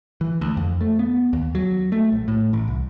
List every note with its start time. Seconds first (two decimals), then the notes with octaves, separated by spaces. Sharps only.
0.21 E3
0.41 D2
0.57 F2
0.81 A3
0.99 B3
1.33 D#2
1.55 F#3
1.92 A3
2.12 A#1
2.28 A2
2.53 A1
2.68 C2